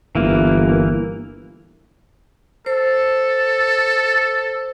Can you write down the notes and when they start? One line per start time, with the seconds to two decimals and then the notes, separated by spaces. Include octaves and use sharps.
0.15 G1 E3 A#3
2.66 A4 C5